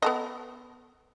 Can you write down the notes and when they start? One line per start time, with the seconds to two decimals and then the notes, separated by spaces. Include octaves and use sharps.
0.02 B3 A4 D#5